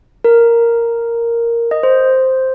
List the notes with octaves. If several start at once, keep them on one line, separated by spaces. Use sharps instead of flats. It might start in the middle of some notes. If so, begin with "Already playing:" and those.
A#4
D#5
C5